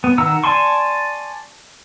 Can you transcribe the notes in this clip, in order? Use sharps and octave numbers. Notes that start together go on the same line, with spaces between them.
B3
D#3 F#5 A#5 E6
D5 G#5 A5 C6 C#6